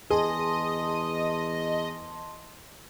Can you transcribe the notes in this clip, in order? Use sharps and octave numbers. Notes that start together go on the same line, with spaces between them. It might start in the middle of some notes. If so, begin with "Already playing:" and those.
E2 G#4 D#5 A5 C6